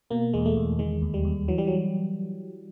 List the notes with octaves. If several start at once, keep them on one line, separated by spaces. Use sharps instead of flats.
B2 A#3
E2 G#3
A3
E2
D#3 G#3
D#2
G3
D#2
E3 F#3
G3
F#3